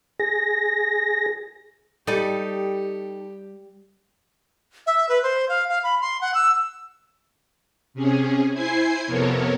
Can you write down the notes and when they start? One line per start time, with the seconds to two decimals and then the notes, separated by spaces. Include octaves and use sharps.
0.20 G#4 A#6
2.07 G3 D#4 G4 A4
4.87 E5
5.09 B4
5.23 C5
5.49 F5
5.69 F5
5.84 B5
6.01 C6
6.21 F#5
6.34 E6
7.94 C3 C#4 G#4
8.53 E4 C5 G#5 G#6 C7
9.06 F2 C3 B3 A4 A#4 C#5